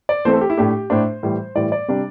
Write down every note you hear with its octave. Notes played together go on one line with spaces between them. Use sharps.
D5
E3 A3 C4 C5
A4
G4
E4
A2 A3 D4 G4
A2 A3 D4 C5
A2 E3 G3
A2 E3 G3 D5
D5
C3 G3 D4